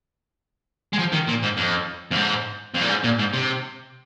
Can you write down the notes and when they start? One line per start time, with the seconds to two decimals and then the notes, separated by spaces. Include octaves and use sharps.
0.93 G#3
0.99 F3
1.12 D#3
1.27 A#2
1.42 G#2
1.57 F2
2.11 F2
2.15 G#2
2.75 F2
2.82 A#2
2.89 G#2
3.04 A#2
3.18 G#2
3.33 C3